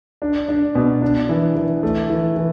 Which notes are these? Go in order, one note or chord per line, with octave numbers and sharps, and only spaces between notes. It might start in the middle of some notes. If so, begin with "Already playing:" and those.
D4
D4
B2
D4
E3
E3
A3
E3
E3